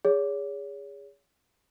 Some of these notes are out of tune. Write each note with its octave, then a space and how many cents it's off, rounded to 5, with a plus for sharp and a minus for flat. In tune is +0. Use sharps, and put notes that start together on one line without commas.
G#4 -20 C#5 +35